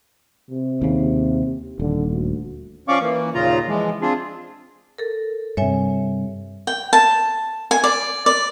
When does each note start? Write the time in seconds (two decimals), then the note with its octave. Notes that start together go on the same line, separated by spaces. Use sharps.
0.50 C3
0.82 D#2 C#3
1.80 D#1 D3
2.10 D2
2.88 F3 C#4 D5 F5 C#6 D6
3.01 E3 A#3
3.34 D#2 A#2 C#3 F4 A#5
3.68 E3 F3 G#3
4.01 C4 D4 F4 G#4
4.98 A4 A#4
5.57 G2 C3 C#5 E5 G#5
6.67 G5
6.93 A5
7.71 G#5
7.84 D5
8.26 D5